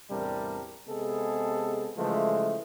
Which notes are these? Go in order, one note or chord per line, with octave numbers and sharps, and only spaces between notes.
E2 A2 C3 G3 D4 A#4
C3 G#3 B3 G#4 A4
C#3 E3 F3 G#3 A3